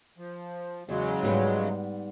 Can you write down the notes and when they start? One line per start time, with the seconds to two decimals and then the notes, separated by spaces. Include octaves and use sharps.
0.18 F3
0.89 E2 C#3 F#3 G#3
1.23 G#2 G3 B3